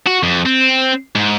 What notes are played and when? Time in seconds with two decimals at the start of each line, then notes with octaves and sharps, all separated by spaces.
0.06 F#4
0.23 F2
0.46 C4
1.15 G#2